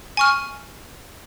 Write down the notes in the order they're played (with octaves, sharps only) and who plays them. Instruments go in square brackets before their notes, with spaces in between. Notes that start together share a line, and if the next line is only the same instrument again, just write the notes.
[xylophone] G#5 C#6 F6